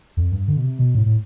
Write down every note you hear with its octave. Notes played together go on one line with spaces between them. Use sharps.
F2
G2
D3
B2
C3
B2
A2
A2